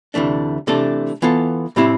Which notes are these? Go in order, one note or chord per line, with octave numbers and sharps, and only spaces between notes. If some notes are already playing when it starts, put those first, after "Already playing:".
D2 C3 E3 A3 D4
C3 E3 A3 D4 A4
E3 B3 F4 A4
A2 G3 C4 E4 G4